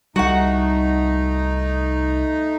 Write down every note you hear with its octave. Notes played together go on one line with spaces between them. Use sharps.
C2 G3 A3 D#4 F#4 F#5